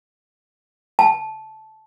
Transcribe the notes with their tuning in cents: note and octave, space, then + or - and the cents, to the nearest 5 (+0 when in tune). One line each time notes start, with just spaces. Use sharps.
A5 -15